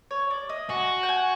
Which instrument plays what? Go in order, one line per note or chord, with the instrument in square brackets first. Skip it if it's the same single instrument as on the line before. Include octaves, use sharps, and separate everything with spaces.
[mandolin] C#5
D5
D#5
[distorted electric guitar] F#4 [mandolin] G#5
[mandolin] G5
G#5